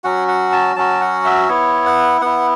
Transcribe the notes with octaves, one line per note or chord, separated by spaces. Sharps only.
F#3 C#4 F#4 F#5
F#5
A5
F#3 C#4 F#4 A5
F#5
E5
B3 E4 C#5
F#5
B3 E4 F#5